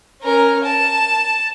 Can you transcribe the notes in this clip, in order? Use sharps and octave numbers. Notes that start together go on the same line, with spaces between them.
C#4 A#4
A5